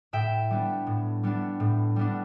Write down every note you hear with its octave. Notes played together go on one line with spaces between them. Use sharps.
A2 E5 G5
G3 B3 D4
A2
G3 B3 D4
A2
G3 B3 D4